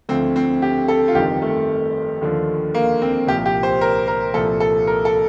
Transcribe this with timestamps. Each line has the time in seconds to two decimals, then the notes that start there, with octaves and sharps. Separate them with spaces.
0.09 D2 D3 F3 C4
0.36 C4
0.62 G4
0.88 A4
1.08 F4
1.15 G1 F2 D#3 G4
1.42 A3
2.21 D#2 D3 F3
2.75 A#3
3.02 C4
3.27 C2 A#2 F3 G4
3.46 G4
3.63 C5
3.81 A#4
4.08 A#4
4.34 C2 A#2 F3 A4
4.60 A4
4.87 A#4
5.05 A4